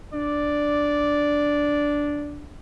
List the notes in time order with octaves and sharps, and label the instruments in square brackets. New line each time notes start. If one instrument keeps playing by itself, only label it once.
[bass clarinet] D4 [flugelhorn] D5